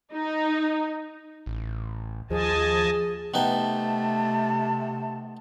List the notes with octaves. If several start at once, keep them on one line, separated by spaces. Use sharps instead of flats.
D#4
A1
D#2 F3 G#4 D#5 G#5 A5
C3 A3 B3 D#4 G5 A5